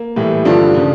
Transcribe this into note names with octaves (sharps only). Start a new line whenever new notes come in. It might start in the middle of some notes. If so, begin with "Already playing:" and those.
Already playing: A#3
A2 E3 G3
G2 D3 F3 D4 F4
C#3 F3